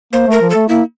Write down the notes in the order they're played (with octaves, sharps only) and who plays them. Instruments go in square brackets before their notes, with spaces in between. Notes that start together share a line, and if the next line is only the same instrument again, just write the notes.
[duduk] A#3 [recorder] C5
[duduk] A3 [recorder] A#4
[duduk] F3
[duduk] A3 [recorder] A4
[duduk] A#3 [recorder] E4